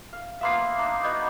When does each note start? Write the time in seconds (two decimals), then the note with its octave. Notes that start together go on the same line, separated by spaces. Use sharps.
0.13 F5
0.41 A#3 B3 E5 F5 C6 C7
0.78 D4 D#4
1.03 B3 F#4 D#5 B5 G6